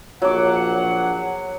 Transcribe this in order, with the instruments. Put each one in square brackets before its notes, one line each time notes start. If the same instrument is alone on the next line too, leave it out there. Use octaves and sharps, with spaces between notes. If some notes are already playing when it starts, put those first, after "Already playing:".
[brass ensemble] A#1 F#5 [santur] F#3 D6